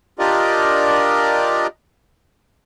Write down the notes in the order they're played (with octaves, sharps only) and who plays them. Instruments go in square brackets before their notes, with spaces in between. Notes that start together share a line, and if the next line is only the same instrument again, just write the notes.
[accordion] D4 F4 G4 A#4 D5 D#5